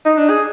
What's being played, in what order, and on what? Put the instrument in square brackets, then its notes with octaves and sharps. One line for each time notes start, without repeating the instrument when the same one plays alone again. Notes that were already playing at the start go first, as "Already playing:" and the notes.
[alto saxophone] D#4
D4
G#4